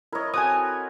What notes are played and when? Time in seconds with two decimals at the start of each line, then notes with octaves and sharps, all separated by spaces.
0.12 E4 A#4 C#5 D#5
0.34 C4 F#4 A4 G#5 D#6